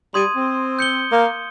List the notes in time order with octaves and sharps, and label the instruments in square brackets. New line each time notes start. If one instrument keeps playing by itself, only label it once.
[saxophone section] G3 [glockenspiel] C6 D#6 G#6 D#7
[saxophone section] C4
[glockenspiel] G6 C#7 G7
[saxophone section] A#3